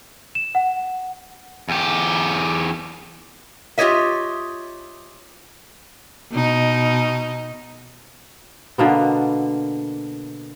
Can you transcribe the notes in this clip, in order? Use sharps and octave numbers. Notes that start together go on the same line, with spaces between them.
E7
F#5
E2 G4
F4 G4 C5 C#5 D#5 E5
B2 D#4
B2 D3 A#3 B3